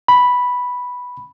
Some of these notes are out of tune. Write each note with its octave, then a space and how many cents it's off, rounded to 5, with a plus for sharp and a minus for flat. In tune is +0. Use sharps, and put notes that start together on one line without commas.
B5 -5